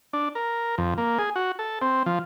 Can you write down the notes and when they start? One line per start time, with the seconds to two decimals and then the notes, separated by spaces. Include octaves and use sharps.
0.13 D4
0.35 A#4
0.78 F2
0.98 A#3
1.19 G#4
1.36 F#4
1.59 A4
1.82 C4
2.06 F3